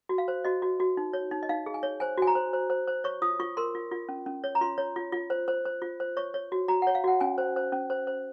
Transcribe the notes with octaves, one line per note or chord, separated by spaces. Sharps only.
F#4
F5
C5
F#4 D#5
F#4
F#4
D#4
C#5
D#4
D#5
D#4 F5
G#4
G#5
C#5
C5 G#5
F#4 G#5
A#5
C5
C5
C5
C5
C#5 C#6
F4 D#6
F4 C#6
A#4 C6
F4
F4
C#4
C#4
C#5
A#5
F4 C6
C#5
F4
F4
C5
C5
C5
F4
C5
C#5 C#6
C#5
F#4
F#4 A#5
C#5 F#5
F5
F#4 F#5
C#4 G#5
C5
C5
C#4
C5
C5